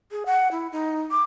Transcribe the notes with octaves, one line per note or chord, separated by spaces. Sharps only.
G#4
F#5
E4
D#4
D6